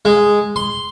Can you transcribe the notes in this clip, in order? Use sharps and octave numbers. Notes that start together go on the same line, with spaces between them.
G#3
C6